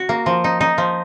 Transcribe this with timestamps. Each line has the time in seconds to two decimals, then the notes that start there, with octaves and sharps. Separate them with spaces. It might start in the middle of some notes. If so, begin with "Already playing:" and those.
Already playing: F#4
0.09 A#3
0.26 F3
0.44 D#4
0.61 D#4
0.78 F3